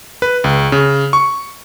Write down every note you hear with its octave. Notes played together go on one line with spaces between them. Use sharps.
B4
C#2
C#3
C#6